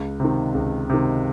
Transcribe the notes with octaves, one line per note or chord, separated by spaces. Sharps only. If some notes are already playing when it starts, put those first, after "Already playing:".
Already playing: C#2
C3 D#3
C#2
C3 D#3